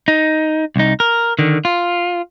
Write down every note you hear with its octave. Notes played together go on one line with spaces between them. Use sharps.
D#4
C2 D#4
A#4
D3 D#3
F4